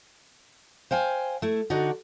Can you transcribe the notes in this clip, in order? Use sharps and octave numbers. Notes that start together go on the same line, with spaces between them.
C5 F5 G5 G#5
A3 E4
D3 D#4 F#4 D5